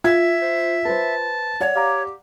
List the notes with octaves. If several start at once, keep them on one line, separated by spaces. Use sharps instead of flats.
F4 E5 G#6
C5
B4 C5 A5
C#5 D5 F#5
G4 F5 A#5 D6